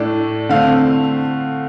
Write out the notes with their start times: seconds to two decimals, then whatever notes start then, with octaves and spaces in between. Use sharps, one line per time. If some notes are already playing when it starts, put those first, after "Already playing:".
Already playing: A2 A3 D4
0.49 D3 A3 C4 F5